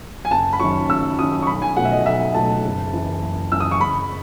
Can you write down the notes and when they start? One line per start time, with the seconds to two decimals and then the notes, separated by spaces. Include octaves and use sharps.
0.25 G#5
0.31 F#1 A5
0.53 B5
0.60 F#2 D#3 F#3 C#4 C#6
0.89 F#1 E6
1.19 F#2 D#3 F#3 C#4 D#6
1.42 C#6
1.47 B1 B5
1.62 G#5
1.77 B2 F#3 A3 F#5
1.85 E5
1.92 D#5
2.05 B1 E5
2.34 B2 F#3 A3 A5
2.65 F#1
2.93 F#2 E3
3.22 F#1
3.52 F#2 E3 E6
3.60 D#6
3.71 C#6
3.80 F#1 B5